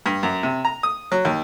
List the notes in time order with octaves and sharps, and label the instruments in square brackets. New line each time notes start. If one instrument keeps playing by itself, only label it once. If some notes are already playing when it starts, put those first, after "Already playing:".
[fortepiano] G2
F#2
C3
A#5
D#6
F#3
D#2